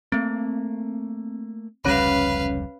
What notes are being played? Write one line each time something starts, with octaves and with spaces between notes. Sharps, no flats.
A3 A#3 C4
F1 C#2 G3 C#4 B4 C#5 F5 B5